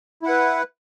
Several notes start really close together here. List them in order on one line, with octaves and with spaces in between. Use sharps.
E4 F#5 B4